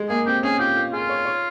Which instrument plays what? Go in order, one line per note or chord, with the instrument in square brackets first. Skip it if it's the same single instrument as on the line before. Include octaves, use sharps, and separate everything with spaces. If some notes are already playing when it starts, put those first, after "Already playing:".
Already playing: [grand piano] G#3
[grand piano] A#3 [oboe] G#4
[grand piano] C4 [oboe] G4
[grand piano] C#4 [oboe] G#4
[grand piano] F4 [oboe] G4
[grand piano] F4
[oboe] F4 [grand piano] G#4
[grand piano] C#5
C#5